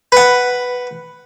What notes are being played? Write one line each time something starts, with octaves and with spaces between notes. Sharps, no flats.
B4 F#5